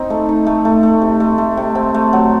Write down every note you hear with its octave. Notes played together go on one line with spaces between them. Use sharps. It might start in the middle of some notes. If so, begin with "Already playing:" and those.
Already playing: C4 D#4
A3
D#4
A3
A3
A3
C3
A3
A3
C3
C4
A3
F#3